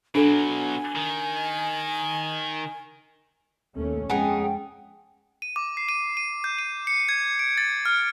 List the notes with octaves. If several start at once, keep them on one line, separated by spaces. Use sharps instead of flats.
B2 F#3 D4 A4 G#5
D#3
D#2 A3 C#4 A4
F2 G#3 B3 C#4 D#4 G#4 G5 G#5
D#7
D6
C7
D#7
D#7
G6
D#7
C#7
G#6
D7
A6
F6